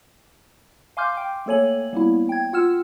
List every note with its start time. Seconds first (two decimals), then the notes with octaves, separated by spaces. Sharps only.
0.97 F5 G#5 C6 D6 F6 G6
1.17 G5
1.46 A3 A#3 A4 C#5 G#5 F#7
1.93 G3 A#3 B3 E4
2.29 G5 G#6
2.53 F4 F#5 E6 F6 E7